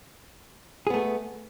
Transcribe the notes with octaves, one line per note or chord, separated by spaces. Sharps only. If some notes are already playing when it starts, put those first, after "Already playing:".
A3 B3 G#4